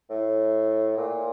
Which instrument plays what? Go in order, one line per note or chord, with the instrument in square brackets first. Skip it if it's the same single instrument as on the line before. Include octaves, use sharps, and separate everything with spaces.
[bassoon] A2
A#2